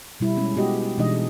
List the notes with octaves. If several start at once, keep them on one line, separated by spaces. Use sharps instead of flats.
B2 G3 E4
G3 G#3 C#4
G#3 B3 F#4 G4 D#5
B2 E3 G#3 D4 D#4 D#5